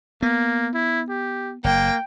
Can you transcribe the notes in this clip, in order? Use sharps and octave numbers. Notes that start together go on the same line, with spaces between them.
A#3 B3
E4
G4
F#1 A#3 G5